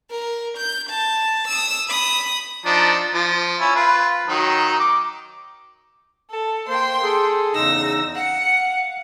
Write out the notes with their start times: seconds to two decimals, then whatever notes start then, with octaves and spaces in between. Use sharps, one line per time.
0.11 A#4
0.57 G6
0.90 A5
1.48 D#6 E6
1.89 B5 D#6
2.66 F3 D4 D#4
3.14 F3
3.60 C#4 E4
3.76 F4 B4
4.28 D#3 F#3 D#4
4.80 D6
6.30 A4
6.68 A#3 C5 G5 C6
7.03 G#4 A4
7.54 E2 C#3 D#4 E6 A#6
8.15 F5 F#5 C#7